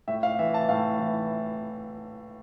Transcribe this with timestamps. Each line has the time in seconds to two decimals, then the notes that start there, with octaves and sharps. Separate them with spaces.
0.08 A2 E5
0.23 F5
0.39 E3 E5
0.54 A5
0.69 A2 F5
0.99 E3